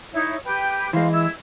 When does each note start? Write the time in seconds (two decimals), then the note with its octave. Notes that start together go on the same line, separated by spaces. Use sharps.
0.13 D#4 E4 C#5
0.44 G4 B4 G5
0.93 E3 G#3 C5 F5
1.11 E4 E6 G#6